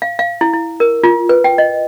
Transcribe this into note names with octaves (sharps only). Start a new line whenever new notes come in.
F5
F5
E4
E4
A#4
F4
B4
G5
D#5